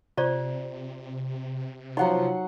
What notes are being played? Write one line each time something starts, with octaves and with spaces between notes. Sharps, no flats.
C3 F4 C5 D5
F3 F#3 D#4 F#5 C6